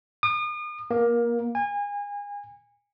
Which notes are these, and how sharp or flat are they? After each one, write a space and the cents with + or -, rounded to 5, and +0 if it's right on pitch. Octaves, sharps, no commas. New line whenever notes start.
D#6 -40
A#3 +20
G#5 -30